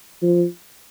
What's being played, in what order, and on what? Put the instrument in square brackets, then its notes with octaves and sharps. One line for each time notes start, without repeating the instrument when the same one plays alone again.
[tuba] F3